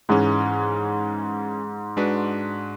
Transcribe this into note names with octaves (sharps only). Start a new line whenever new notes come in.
G#2 E3 G#3 C#4
G#3 D4 F#4 B4